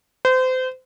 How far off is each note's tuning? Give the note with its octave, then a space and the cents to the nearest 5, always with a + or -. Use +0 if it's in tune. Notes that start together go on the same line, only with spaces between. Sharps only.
C5 -30